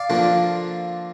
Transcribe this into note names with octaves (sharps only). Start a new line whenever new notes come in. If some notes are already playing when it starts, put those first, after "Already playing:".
Already playing: D5 F5
D3 F3 A#3 D4